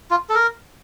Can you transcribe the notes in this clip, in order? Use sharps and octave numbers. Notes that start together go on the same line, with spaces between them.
F4
A4
A#4